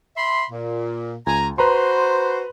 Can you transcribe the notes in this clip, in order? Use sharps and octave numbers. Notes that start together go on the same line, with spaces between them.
E5 B5 C6
A#2
C#2 G#5 A#5
F#4 B4 C5 A#5 C6